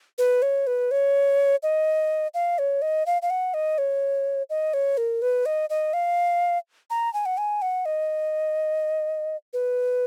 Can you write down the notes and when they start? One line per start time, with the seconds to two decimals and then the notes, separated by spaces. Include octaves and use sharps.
0.18 B4
0.42 C#5
0.67 B4
0.91 C#5
1.63 D#5
2.34 F5
2.59 C#5
2.82 D#5
3.06 F5
3.22 F5
3.30 F#5
3.54 D#5
3.78 C#5
4.50 D#5
4.74 C#5
4.97 A#4
5.22 B4
5.46 D#5
5.70 D#5
5.93 F5
6.90 A#5
7.14 G#5
7.26 F#5
7.38 G#5
7.62 F#5
7.86 D#5
9.53 B4